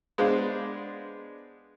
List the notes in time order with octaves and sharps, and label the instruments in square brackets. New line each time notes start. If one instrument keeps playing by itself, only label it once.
[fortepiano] G#3 B3 D4 C5 D5 F5